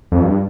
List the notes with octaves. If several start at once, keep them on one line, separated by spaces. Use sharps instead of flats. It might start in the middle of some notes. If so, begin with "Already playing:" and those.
F2
G2